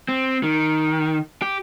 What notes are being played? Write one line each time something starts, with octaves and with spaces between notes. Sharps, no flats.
C4
D#3
G4